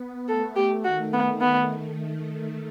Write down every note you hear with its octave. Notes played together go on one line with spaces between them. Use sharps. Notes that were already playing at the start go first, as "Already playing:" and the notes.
Already playing: B3
A3 A4
G4
D#3 F#4
B3
B3